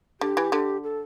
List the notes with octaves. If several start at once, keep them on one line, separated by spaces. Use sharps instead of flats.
D3 G4
E3
D3
A4